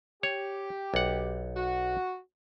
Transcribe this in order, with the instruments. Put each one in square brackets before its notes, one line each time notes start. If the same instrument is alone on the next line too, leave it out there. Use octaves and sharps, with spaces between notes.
[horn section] G4 [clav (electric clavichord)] C#5
[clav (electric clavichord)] B1 F#5
[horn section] F#4